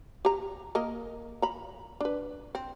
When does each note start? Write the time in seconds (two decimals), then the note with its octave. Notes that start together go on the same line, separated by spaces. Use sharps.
0.25 G4 A#5
0.75 A#3 A#4 D#5
1.42 A#5 B5
2.01 D4 B4
2.55 C4